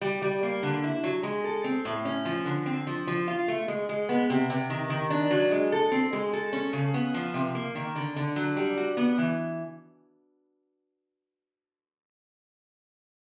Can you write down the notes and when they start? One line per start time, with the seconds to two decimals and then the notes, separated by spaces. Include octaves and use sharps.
0.01 G3
0.22 G3
0.43 A#3
0.63 D3
0.84 E4
1.04 F#3
1.23 G#3
1.44 A4
1.64 C4
1.85 A2
2.05 C#4
2.25 F3
2.46 D3
2.66 C4
2.87 F3
3.07 F3
3.28 F4
3.48 A3
3.68 G#3
3.89 G#3
4.09 B3
4.30 C3
4.50 C3
4.70 D#3
4.90 D#3
5.10 D4
5.31 F#3
5.51 G#3
5.72 A4
5.92 C4
6.13 G#3
6.33 A4
6.53 C#4
6.73 C#3
6.94 B3
7.14 F3
7.34 C3
7.55 A#3
7.75 D#3
7.95 D3
8.16 D3
8.36 F#3
8.57 G3
8.77 F#4
8.97 B3
9.18 E3